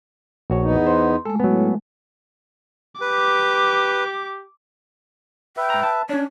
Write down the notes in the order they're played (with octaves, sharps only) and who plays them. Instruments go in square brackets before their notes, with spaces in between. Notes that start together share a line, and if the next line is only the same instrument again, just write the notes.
[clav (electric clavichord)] A#1 F#4 C#5
[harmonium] E2 B3 D#4
[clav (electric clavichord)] C5 F#5 [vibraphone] C6
[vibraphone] G#3 A3 [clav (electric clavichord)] A4
[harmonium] A2 [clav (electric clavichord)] F#3 B3
[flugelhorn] G4 [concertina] B4 [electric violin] D6
[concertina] B4 E5 [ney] G5
[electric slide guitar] G#2 A#5
A5
[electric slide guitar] C#4 D4 [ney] C#5